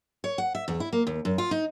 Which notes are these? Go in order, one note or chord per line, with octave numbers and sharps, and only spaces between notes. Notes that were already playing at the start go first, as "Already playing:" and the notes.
C#5
F#5
E5
E2
E4
A#3
D#2
F#2
F4
D#4